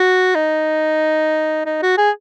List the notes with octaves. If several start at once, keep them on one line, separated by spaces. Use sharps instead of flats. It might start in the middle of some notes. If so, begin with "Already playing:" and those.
Already playing: F#4
D#4
D#4
F#4
G#4